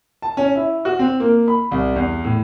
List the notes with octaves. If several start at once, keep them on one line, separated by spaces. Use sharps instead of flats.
A5
C#4
E4
F#4
C4
A#3
B5
C2
E2
A2